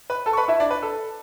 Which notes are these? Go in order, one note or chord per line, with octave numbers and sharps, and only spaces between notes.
B4 B5
A4 A5
C#6
B4 B5
E4 E5
D4 D5
B4
A4